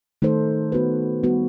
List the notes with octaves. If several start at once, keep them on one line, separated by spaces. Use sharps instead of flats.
D#3 A3 D#4 A4 C5
B3 F#4 B4
G3 B3 F#4 B4